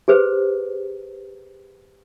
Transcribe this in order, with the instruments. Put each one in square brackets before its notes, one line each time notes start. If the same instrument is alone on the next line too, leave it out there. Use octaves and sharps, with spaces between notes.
[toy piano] G4 G#4 B4 C5